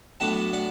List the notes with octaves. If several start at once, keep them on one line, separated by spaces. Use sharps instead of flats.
A2 F#3 B3 D4 F#5 A5
D5 F#5